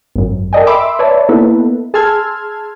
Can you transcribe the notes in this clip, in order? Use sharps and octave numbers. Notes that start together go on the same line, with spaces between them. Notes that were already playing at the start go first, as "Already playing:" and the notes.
G#1 F#2
A4 A#4 D5 D#5 G5 G#5
E5 B5 C6 D6 E6
B4 C#5 D5 E5 A5
A#3 B3 D#4 E4 A4 B4
G#4 A5 C6 E6 F6 G#6